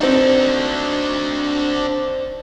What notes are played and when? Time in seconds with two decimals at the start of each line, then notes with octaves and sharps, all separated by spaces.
0.01 C4 D4 D#4 F#4